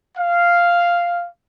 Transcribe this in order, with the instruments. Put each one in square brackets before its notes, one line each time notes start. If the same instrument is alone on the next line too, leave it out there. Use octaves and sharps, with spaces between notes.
[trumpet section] F5